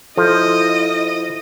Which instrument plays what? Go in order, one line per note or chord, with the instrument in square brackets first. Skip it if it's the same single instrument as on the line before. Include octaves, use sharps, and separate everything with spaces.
[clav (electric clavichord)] F3 [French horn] E4 [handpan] A4 [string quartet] D#5